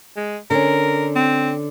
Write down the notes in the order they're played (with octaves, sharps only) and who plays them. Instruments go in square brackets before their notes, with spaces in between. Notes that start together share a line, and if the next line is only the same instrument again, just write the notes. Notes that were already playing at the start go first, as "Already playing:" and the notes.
[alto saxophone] G#3
[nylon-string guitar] D3 C#4 [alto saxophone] A#4
[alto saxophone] C4